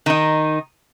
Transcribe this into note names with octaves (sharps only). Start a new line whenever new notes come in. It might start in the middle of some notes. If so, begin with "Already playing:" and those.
D#3 D#4